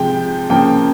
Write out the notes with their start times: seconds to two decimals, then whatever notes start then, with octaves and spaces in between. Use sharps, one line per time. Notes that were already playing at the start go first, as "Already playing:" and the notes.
Already playing: C3 F3 G#3 G5
0.50 C#3 F3 A#3 G5